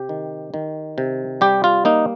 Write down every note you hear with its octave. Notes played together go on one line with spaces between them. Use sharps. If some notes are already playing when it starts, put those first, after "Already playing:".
Already playing: C3 G4
D#3
D#3
C3
G3 G4
F4
A#3 D#4